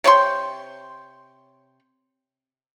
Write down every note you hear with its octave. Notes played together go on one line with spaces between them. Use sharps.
C3 C#5 G5 C6